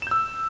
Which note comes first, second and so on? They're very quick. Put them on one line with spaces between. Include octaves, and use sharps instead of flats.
E7 G6 E6